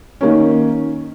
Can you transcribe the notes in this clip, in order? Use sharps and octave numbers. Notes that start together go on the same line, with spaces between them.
D#3 A#3 C#4